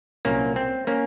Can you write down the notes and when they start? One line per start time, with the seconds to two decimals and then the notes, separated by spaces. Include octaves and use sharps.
0.25 C2 A#2 F#3 A#3 C#4
0.56 C4
0.87 A#3 C#4